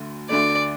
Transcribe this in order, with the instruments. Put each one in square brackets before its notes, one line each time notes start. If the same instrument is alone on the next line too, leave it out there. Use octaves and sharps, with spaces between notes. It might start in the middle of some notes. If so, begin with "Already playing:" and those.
Already playing: [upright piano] D2 D3 A3
[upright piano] D2 D3 A3 [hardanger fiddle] D5